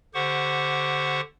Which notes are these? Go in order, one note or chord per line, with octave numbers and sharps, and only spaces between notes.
D3 G4 C5 F#5 C#6